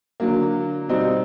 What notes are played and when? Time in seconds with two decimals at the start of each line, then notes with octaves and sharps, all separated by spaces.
0.20 D3 F#3 A#3
0.88 B2 G3 C4 D#4